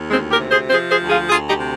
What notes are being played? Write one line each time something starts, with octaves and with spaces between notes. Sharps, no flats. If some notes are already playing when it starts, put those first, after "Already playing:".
Already playing: D#2
D2 G#3 C4
G4 A#4
C3
G#4 C5
F3 G#4 C5
G#4 C5
D2
F4 G#4
D2 F4 G#4
D#4 G4
C3